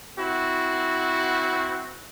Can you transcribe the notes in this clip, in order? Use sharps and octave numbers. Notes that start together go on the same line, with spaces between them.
C4 E4 F#4